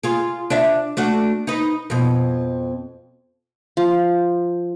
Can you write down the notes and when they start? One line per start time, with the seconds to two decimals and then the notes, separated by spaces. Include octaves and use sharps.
0.03 F4 G#4
0.50 D4 D5 E5
0.97 A3 D4 F#4
1.47 D#4 B4
1.90 F2 B2
3.77 F3